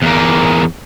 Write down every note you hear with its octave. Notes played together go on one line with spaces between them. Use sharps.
E2 A#3